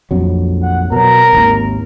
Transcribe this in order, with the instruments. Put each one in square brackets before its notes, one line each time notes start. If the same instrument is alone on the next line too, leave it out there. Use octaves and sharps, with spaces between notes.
[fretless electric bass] A#1 F2 F#3
[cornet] F#5
[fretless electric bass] B2 F#3 [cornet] A#4
[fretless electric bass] G#1 D#2